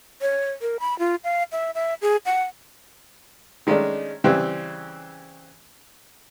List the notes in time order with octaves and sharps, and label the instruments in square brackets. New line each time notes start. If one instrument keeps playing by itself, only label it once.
[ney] C#5
A#4
B5
F4
F5
E5
E5
G#4
F#5
[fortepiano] D#3 G#3 A3 C#4 D4
C#3 E3 G3 C4